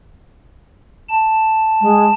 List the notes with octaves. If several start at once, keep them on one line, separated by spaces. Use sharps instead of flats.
A5
G#3